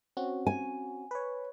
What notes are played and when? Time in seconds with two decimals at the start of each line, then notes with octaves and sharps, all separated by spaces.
0.17 C4 C#4 F#4
0.47 G#5
1.11 B4 C#5